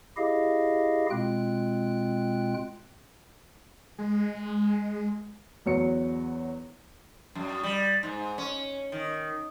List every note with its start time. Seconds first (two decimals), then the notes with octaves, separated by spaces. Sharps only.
0.17 E4 G4 G#4 D#5 F5
1.10 B2 G#3 C4 F4 G5 F#6
3.99 G#3
5.66 E2 F#3 C#7
7.35 F#2
7.63 G3
8.03 G#2
8.38 C#4
8.92 D#3